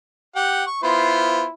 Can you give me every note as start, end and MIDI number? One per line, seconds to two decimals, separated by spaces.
0.36 0.64 67
0.36 0.64 78
0.36 0.64 79
0.67 0.80 85
0.83 1.43 59
0.83 1.52 64
0.83 1.43 65
0.83 1.43 72